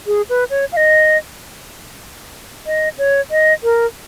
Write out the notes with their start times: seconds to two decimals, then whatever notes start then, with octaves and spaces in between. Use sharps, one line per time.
0.07 G#4
0.29 B4
0.50 C#5
0.72 F5
0.77 D#5
2.66 D#5
2.98 C#5
3.31 D#5
3.63 A#4